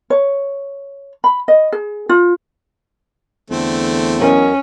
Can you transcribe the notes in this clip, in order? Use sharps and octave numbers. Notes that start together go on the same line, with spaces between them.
C#5
B5
D#5
G#4
F4
E2 D3 A3 C4
F#3 C#4 A#4 D#5